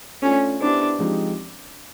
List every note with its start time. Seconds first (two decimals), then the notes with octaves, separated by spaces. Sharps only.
0.22 A3 C#4 D4 F4 A4
0.60 B3 D4 E4 G4 C5
0.99 F3 G#3 C4 D#4 G4